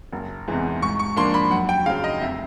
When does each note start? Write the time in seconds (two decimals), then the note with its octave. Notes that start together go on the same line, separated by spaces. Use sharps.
0.13 F#1
0.47 E2 C3 E3 G#3
0.82 G#2 C#6
0.99 C#6
1.17 F3 A#3 D4 C6
1.34 B5
1.51 F#2 F#5
1.69 G5
1.86 C#3 F5
1.90 F#3
2.04 D#5
2.21 F1 E5